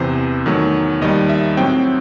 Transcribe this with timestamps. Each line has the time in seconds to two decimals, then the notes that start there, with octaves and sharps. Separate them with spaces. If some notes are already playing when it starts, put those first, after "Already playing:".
Already playing: E2 C3 E3 C5
0.46 E2 D#3 F#3 A3
1.02 D#2 D#3 G3 D#5
1.29 E5
1.57 A2 F#3 C4 G5